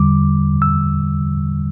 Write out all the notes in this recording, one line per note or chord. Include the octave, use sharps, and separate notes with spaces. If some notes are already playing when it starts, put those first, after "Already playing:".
Already playing: E2 D3 G3 D6
E6